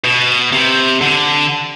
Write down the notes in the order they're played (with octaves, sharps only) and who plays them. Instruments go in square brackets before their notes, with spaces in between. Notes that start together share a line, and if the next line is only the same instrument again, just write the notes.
[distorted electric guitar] B2
C3
D3